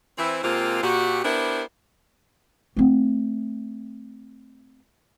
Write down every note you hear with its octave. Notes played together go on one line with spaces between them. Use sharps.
E3 C4 E4
C3 G#3 A#3 C4 F4
A#2 F#4 G4
B3 D4 E4 G4 A#4 C5
A3 C4